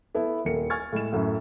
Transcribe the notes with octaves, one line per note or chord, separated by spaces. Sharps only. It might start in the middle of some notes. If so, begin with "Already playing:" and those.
B3 E4 A4
D#1 A#4 C#7
G#5 C#6 F6 G#6 A6
A2 G#3 E7
F#2 A2